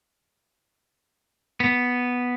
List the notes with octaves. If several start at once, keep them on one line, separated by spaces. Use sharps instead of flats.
B3